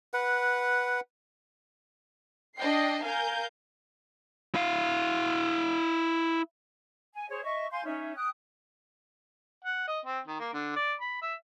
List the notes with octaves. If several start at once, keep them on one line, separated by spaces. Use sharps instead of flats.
B4 F#5
D4 D#5 G5 C7
A#4 F5 G#5 G6
E4 F5
G#5
G#4 C5 C#5
D#5 E5 C#6
F5 G#5 C6 G6
C#4 D#4 E5
G5 D#6 F#6
F#5
D#5
C4
D#3
A#3
D3
D5
B5
E5